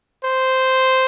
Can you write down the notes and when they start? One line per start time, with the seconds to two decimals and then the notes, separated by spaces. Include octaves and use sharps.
0.24 C5